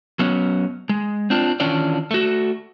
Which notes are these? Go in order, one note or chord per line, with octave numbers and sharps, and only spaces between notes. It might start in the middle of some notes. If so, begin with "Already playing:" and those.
F#3 B3 C#4
G#3
C4 D4 F4
D#3 E3 C#4 D4 F4 D5
A3 F#4